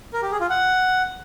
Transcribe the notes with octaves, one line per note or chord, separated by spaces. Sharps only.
A#4
G4
G#4
F4
F#5